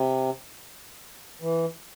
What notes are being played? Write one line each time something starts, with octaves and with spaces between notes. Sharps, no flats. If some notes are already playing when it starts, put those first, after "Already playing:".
Already playing: C3
E3